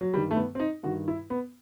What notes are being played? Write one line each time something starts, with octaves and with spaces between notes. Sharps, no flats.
F#3
G2 D#3 G3
A3
B3
C4
D#4
G2 D#3 F#4
E4
B3